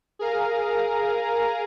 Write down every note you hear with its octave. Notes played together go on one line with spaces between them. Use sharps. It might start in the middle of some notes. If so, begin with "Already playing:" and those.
G#4 A#4 F5 A#5